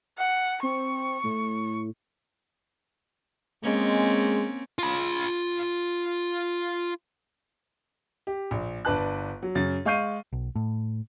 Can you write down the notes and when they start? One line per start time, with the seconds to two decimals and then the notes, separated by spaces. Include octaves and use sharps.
0.18 F#5
0.63 C4 C#6
1.23 A2
3.63 G#3 A#3 C4 C#4
4.79 F4 B5
8.27 G4
8.51 A#1
8.85 G1 D4 B4 A5 F#6
9.43 F#3
9.55 F#2 C#3 A6
9.85 G#3 F5 C#6 G6 C7 D#7
10.33 B1
10.55 A2